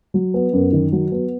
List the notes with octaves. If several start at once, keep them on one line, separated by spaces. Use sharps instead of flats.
F#3
B3
F#2
D#3
F#3
B3